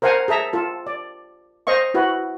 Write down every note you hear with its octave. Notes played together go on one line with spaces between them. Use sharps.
A#4 C5 F5 F#5 G#5 A#5
G#4 A4 E5 A#5
F4 A4
D5
C5 D#5 F5 C#6
E4 F#4 B4